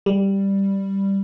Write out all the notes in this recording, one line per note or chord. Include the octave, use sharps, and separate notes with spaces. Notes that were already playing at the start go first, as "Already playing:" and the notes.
G3